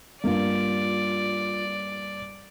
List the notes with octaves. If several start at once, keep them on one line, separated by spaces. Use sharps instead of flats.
G2 A#3 F4 D5